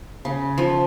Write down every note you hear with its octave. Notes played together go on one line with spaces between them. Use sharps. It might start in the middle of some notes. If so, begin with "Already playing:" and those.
C#3
F3